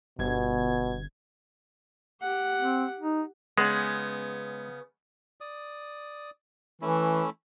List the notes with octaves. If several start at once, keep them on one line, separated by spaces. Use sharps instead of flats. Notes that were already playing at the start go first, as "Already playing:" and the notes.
G1 B2 G#6
G4 F#5
C4
D#4
C#3 G#3 B3
D5 D#6
E3 A3 C#4 E4